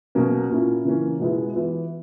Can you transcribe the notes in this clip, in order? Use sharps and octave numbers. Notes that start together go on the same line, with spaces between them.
B2 F#3 A#3 C#4
A#2 A#3 C#4 E4
C#3 E3 A#3 C#4
B2 G#3 B3 E4
E3 B3 E4